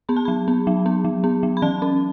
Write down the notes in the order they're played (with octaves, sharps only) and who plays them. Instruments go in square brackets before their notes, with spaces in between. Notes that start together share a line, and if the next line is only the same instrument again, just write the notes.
[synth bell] B3 B5
A5
F#3 B5
B3
F#3
B3
F#3
B3
F#3
B5
E3 A5
C#4